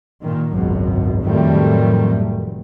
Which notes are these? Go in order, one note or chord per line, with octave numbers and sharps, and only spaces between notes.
A#2 D#3
G#1 C#2 F#2 B2
F2 A2 D#3 F#3 G3 A3
F1